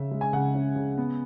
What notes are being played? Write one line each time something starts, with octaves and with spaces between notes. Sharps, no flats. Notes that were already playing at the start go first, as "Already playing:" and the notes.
Already playing: C#3 C#4 E5
G#3
G#5
C#3 F#5
C#4
C#3
B3